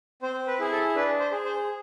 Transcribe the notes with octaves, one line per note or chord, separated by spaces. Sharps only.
C4 C5
B4
E4 G#4
A4
D4 B4
C5
G#4
C5